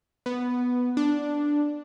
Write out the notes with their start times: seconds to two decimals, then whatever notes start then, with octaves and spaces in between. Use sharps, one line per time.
0.26 B3
0.97 D4